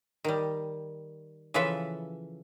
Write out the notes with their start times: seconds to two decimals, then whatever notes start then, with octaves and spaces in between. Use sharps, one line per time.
0.24 D#3 G3
1.54 C#3 E3 F3 A4 B4 E5